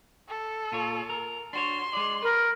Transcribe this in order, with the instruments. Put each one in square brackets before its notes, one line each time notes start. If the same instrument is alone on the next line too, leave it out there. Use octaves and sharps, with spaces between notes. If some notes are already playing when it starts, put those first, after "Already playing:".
[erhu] A4
[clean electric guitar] A#2 F4 C#5
A#4
[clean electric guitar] D4 F#4 C#5 [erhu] C6
[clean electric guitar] G#3 D5
[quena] A#4 [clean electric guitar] B4